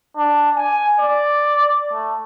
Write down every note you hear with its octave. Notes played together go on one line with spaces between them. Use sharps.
D4
G#5
D5
A3